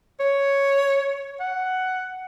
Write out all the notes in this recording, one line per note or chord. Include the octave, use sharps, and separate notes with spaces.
C#5
F#5